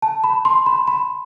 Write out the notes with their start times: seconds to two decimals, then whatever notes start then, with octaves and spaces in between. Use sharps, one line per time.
0.02 A5
0.24 B5
0.45 C6
0.66 B5
0.87 B5